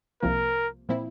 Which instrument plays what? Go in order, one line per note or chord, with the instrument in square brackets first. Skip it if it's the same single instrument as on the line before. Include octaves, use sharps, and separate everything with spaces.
[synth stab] C2 C3 F3 A#3 [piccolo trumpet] A#4
[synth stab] A#2 F3 C4 E4